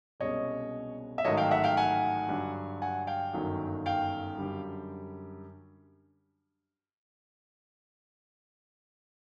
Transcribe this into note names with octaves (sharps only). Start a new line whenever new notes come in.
C2 B2 G#3 C#4 C#5 D#5
E5
A1 G#2 D#3 F#3 A3 C#5 D#5
F5 G5
E5 F#5
F5 G5
F#5 G#5
G2 D3 F#3
F#5 G#5
F5 G5
G1 F#2 D#3 F#3
F5 G5
F#2 D3 G3